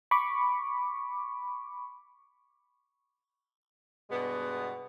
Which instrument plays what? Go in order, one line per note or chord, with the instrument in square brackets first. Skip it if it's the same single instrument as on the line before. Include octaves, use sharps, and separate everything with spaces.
[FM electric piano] B5 C#6 D6
[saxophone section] G2 B2 G#3 B3